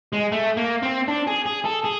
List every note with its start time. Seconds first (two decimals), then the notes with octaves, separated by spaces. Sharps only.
0.13 G#3
0.32 A3
0.57 A#3
0.82 C4
1.08 D4
1.27 G#4
1.46 G#4
1.65 A4
1.84 G#4